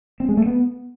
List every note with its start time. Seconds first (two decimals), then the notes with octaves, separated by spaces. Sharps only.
0.20 C4
0.29 G#3
0.37 A3
0.46 B3